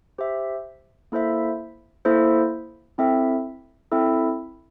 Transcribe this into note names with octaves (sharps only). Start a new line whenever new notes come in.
G4 C5 E5
A#3 E4 A4 C5 E5
A#3 E4 A4 C5 E5
C4 E4 A4 E5
C4 E4 A4 E5